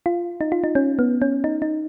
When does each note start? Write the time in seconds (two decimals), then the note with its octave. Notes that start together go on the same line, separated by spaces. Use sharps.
0.06 F4
0.41 D#4
0.52 F4
0.64 D#4
0.75 C#4
0.99 B3
1.22 C#4
1.44 D#4
1.62 D#4